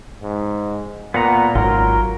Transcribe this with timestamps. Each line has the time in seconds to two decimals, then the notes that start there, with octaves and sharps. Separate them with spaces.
0.23 G#2
1.14 A#2 B3 F#5 A#5
1.55 G#1 F#3 F4 A#4